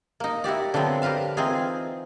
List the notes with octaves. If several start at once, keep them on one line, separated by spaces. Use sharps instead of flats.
A#3 D#4
E4 F#4 G4 D5
D3 F3 F#3 B3 C4
G4 A#4 B4 F5 A5
E3 C4 D#4 F4 G#4